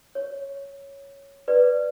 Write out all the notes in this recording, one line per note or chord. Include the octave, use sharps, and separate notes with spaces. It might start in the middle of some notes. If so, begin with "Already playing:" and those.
C#5
B4 D5